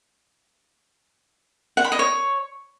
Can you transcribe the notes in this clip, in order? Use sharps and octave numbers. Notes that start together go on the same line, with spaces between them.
F#5
B5
D#5
C#5